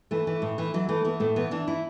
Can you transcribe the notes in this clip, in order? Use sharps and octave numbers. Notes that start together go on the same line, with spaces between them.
E3 A3
E3
A2
E3
E3 F#3
E3 A3
E3 B3
A2 A3
E3 B3
E3 D4
E3 E4